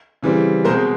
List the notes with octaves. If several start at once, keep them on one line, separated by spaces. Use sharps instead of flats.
C#3 E3 G3 C4
B2 G#3 C4 A#4 C5